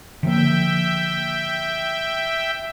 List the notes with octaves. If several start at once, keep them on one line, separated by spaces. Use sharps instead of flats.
D3 F3 A#3 E5 G5